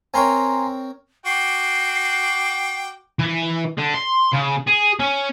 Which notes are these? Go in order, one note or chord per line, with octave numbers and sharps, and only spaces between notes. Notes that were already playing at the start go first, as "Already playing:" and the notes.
C4 A#4 C#5 G#5 A#5 C6
F#4 G5 D6 C7
E3
D3
C6
C#3
G#4
C#4